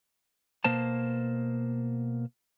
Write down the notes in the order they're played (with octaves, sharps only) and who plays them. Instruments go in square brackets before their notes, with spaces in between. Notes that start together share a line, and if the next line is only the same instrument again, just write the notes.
[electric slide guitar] B2 A#3 C5 A5